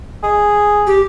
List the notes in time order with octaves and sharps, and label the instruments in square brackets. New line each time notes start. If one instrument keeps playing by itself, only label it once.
[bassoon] G#4
[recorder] G4